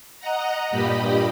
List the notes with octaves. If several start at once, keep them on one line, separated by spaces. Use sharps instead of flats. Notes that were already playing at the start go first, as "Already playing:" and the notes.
D#5 F#5 A#5
G2 A#2 G4 D#5 B5